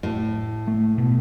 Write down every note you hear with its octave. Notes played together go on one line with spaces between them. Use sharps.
A2
A3
B2